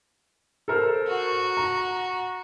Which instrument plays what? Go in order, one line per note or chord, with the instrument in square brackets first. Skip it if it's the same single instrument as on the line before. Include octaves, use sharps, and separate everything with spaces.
[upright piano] A4 A#4 C5
[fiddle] F#4
[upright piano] A#5